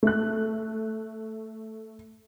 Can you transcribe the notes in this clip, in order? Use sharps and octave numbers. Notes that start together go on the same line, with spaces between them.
A3 F#6